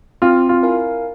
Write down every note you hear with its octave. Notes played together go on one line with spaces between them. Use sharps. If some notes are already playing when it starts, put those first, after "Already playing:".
C4 F4
F4
E4 A#4 F5 G#5